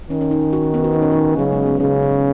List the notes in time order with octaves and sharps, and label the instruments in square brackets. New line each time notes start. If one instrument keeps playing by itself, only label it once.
[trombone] D#3 [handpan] C#4
[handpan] C#4
D#4
F#4
C#4
B3
F#4
D#4
C#4
D#4
[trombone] C#3 [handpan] F#3
[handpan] G#3
B3
[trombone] C#3 [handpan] C#4